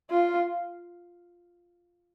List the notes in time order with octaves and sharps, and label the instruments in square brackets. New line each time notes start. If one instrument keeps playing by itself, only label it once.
[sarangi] F4